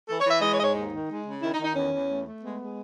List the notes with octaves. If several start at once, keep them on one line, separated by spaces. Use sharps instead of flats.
E3 A4
C#5
E3
E5
G#3 D#5
C#5
G#2 C#5 D#5
D#2 D#4
D#3
G#3
C#3
D#3 E4
D#4
D#3
D#4
E2 C#4
E2
A3
A3
G#3 B3
G#3